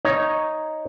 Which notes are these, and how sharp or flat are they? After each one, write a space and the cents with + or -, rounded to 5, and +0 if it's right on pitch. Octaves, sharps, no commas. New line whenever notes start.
D#4 +0 C#5 +0